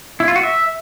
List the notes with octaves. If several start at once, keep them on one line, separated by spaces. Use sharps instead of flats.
E4
F4
F#4
E5